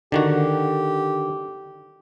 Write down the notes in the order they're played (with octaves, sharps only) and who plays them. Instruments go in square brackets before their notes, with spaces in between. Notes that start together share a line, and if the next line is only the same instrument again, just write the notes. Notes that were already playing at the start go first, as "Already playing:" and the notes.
[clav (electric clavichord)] D3 D#3 F#4 [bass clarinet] G4